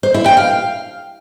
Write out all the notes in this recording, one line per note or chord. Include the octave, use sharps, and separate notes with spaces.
C5
E4
G5
F5